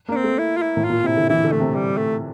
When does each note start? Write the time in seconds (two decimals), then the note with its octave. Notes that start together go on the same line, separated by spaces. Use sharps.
0.08 A#3
0.11 D4
0.16 C4
0.24 A3
0.38 E4
0.57 F4
0.62 E4
0.77 A2
0.84 F4
0.90 A#2
1.03 C3 E4
1.17 D3
1.29 E3 E4
1.44 D3
1.52 A3
1.60 C3
1.75 G3
1.97 A3